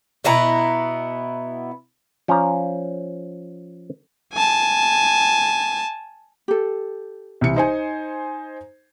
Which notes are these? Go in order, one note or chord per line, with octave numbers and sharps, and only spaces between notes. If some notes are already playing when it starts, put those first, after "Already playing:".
B2 B3 E4 A#5
F3 C#4 F4 D5 A#5
G#5 A5
G4 A4
C2 E3 C#7
D#4 C5 G#5